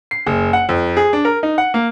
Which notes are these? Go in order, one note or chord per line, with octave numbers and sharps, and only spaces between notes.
C7
F#1
F#5
F2
G#4
D4
A#4
D#4
F#5
A#3